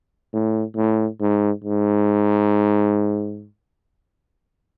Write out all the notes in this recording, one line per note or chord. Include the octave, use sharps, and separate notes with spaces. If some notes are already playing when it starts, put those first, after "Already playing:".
A2
A2
G#2
G#2